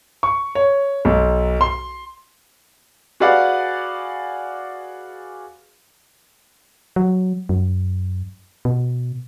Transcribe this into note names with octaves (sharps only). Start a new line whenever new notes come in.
C#6
C#5
B1
C6
F#4 G#4 B4 D5 F5 F#5
F#3
F#2
B2